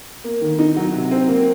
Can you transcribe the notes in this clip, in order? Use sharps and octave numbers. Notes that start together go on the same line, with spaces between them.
A#3
D#3
D#4
F#3
C3
C4
A#3